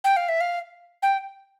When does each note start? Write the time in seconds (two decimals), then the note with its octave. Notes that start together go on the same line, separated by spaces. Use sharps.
0.04 G5
0.17 F5
0.29 E5
0.41 F5
1.02 G5